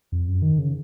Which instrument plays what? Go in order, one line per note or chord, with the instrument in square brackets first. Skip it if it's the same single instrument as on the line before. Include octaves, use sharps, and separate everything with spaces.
[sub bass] F2
F#2
D#3
C#3